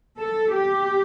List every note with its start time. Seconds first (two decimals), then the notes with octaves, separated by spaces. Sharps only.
0.18 A4
0.52 G4